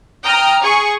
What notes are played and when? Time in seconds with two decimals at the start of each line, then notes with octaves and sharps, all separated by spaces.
0.24 G5 A#5 D#6 F6
0.63 G#4 C#6